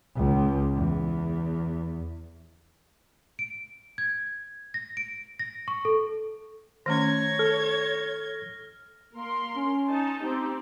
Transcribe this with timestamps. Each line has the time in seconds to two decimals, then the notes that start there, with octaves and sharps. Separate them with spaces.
0.15 C#2
0.76 E2
3.39 D7
3.98 G#6
4.74 A#6
4.97 D7
5.39 A#6
5.68 C#6
5.85 A4
6.86 D#3 A3 C#4 C#5 G#6 A#6
7.39 A4 F6
9.13 A#3 A#4 C6
9.56 C#4
9.89 D#4 A5
10.22 C4 D#4 G4